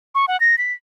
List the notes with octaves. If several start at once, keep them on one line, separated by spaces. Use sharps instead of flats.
C#6
F#5
A#6
B6